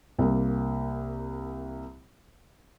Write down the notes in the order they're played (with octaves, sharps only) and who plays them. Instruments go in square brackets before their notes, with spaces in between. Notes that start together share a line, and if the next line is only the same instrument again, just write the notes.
[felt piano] C2 A#3